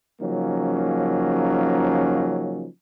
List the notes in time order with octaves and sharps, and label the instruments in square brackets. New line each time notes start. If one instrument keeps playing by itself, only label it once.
[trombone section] C#3 F3 F#3 A#3 C#4 D#4